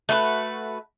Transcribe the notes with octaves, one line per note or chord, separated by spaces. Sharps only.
A3 F#4 G#4 B4